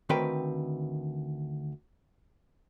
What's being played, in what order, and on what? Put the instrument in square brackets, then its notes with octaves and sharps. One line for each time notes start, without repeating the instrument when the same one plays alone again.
[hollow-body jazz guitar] D2 D#3 C4 A#4 B4 G5